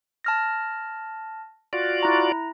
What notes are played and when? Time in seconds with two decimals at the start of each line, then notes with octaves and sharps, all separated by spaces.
0.24 A5 F6 A#6
1.73 F4 F#4 D5
2.03 E4 A#5